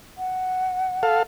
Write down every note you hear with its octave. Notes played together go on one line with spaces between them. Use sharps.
F#5
A4 F5